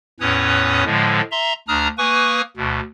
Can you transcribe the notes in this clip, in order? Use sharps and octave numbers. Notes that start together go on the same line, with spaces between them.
E2 A2 C#4 B4 C#5 D#6
A2 D3 F3 G#3
E5 A#5 C6
D2 D4 A#5 D#6 F6
A#3 B4 G#5 C#6 D#6
D2 B2